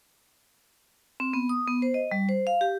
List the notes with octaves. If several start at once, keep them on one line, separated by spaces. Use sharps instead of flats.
C4
B3
D#6
B3
C5
D#5
G3
C5
F5
G4